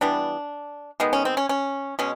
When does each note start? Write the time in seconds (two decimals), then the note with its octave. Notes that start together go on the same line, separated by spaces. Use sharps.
0.01 E3 G3 B3 D4
1.00 D#3 G#3 B3
1.13 C#4
1.25 C4
1.37 C#4
1.49 C#4
1.99 B2 G#3 C#4